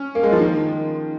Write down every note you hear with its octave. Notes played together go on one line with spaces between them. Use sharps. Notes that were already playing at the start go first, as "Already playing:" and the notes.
Already playing: C#4
A#3
G#3
F3
D#3